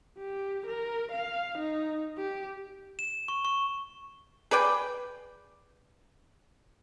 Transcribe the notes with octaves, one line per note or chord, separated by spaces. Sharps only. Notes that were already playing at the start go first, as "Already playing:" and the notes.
G4
A#4
F5
D#4
G4
E7
C#6
C#6
G#4 B4 D5 G5